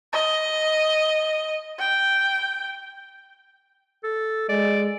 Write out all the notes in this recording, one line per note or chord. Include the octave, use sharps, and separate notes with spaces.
D#5
G5
A4
G#3 D5